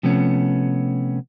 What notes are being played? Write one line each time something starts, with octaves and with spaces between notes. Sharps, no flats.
C3 F3 A3 B3 C#4